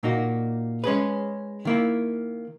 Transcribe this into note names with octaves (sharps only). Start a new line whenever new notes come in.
A#2 A#3 D#4 F#4
G#3 C#4 G#4 B4
D#3 A#3 E4